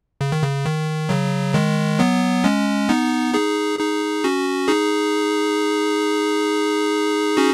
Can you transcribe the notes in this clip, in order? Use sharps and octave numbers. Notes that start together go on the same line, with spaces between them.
C#3
D#3
C#3
D#3
C#3 F#3
D#3 G#3
F#3 B3
G#3 C#4
B3 D#4
D#4 G#4
D#4 G#4
C#4 F#4
D#4 G#4
C#4 F#4